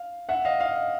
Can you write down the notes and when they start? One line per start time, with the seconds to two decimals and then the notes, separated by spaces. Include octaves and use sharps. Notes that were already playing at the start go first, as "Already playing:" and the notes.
Already playing: F5
0.29 E5 F#5
0.45 D#5 F5
0.60 D#5 F5